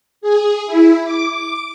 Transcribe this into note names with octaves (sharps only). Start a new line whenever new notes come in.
G#4
E4
D6